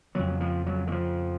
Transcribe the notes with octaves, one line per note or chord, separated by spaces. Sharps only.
F2 C#3 F#3
F3
F#3
D#3
F3